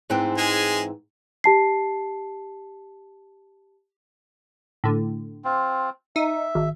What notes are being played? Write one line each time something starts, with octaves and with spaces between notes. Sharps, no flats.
G#2 E3 C4
G#3 G#5
G4 A5 C7
A2 D3
C4 F4
D#4 E5
G#1